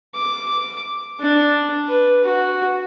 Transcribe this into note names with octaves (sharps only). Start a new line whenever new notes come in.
D6
D4
B4
F#4